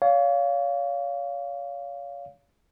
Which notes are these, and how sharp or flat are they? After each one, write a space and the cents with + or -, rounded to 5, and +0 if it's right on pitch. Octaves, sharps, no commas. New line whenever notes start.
C#5 +35 F5 +0